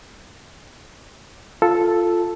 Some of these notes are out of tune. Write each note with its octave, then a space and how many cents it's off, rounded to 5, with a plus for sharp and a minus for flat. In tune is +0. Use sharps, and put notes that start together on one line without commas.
F4 +0 A4 +0